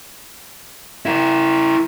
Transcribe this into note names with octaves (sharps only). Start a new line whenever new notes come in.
E4 A#4